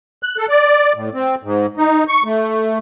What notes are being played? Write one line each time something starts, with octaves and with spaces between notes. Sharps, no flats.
F#6
A4
D5
A2
C4
G#2
D#4
C#6
A3